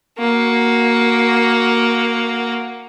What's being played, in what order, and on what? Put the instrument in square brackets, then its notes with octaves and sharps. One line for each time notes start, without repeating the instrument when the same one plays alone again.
[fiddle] A#3 F#4